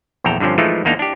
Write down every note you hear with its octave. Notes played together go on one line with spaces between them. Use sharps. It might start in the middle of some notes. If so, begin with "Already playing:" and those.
A#1 E2 A4 G5 A#5
G2 D3 F3 C4 C#4
E3 F3 G#3 A3 D#4 F4
E2 A#3 D4 D#4 A#5
D4 G4